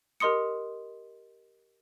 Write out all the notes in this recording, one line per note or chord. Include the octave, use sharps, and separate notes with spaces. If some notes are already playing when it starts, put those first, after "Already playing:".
G4 A#4 D#5 C6 D#6 C#7